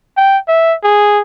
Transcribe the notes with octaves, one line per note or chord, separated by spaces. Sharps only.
G5
E5
G#4